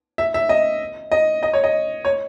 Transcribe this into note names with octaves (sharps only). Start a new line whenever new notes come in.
E5
E5
D#5
D#5
D#5
C#5
D#5
C#5